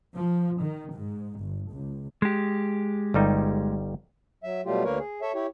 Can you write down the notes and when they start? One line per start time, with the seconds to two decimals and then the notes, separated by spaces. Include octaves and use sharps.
0.15 F3
0.60 D#3
0.94 G#2
1.40 G1
1.71 C#2
2.22 G#3 G4
3.14 G1 G3 D#4
4.44 F#3 E5
4.66 B2 F#3 G3 A3 F4 G4
4.84 D2 D3 A#3 A#4 B4 C#5
4.99 G#4
5.22 A4 C#5 E5
5.35 E4 G4 C#5